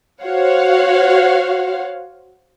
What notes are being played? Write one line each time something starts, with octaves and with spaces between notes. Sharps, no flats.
F#4 C5 C#5 F5 F#5